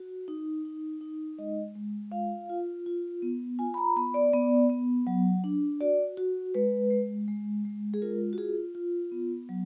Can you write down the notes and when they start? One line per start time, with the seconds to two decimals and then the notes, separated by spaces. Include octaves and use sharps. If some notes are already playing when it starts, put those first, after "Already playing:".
Already playing: F#4
0.28 D#4
0.65 D#4
1.01 D#4
1.38 G#3 D#5
1.75 G#3
2.12 F4 F5
2.50 F4
2.86 F4
3.22 B3
3.59 F4 G#5
3.74 B5
3.78 A#5
3.96 B3 B5
4.14 D5
4.33 B3
4.69 B3
5.07 F#3
5.44 D4
5.81 F#4 D5
6.17 F#4
6.54 G#3 B4
6.91 G#3
7.28 G#3
7.65 G#3
7.94 G#4
8.02 F4 A#4
8.33 F#4
8.38 F4 G#4
8.75 F4
9.12 B3
9.49 F#3